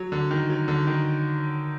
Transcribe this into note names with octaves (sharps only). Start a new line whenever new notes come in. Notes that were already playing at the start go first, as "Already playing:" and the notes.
Already playing: F#3
D3
D#3
F#3
D3
D#3